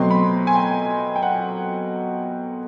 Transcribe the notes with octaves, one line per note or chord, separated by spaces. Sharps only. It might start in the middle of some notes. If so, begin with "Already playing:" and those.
Already playing: B2 F#3 A3 C4 C6
B5
G#5
G5
G5
F#5